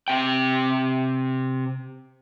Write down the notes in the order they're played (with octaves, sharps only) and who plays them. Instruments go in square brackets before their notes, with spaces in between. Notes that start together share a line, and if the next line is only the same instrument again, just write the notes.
[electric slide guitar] C3 G5